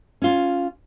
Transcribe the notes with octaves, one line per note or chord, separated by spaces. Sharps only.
C#4 F4